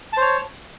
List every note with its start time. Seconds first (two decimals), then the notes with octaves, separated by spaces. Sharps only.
0.13 A5
0.17 C5
0.21 C#5